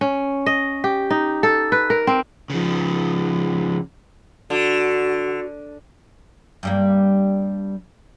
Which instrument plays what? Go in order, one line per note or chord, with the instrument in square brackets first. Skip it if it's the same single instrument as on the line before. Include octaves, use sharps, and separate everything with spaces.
[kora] C#4
D#5
G4
D#4
A4
B4
A#4
C4
[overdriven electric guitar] C#3 F3
[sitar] D3 [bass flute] F#4
[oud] G2 G3 A#3